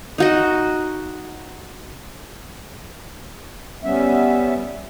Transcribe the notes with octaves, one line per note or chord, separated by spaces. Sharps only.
D#4 F#4 D#5
G3 B3 C#4 E5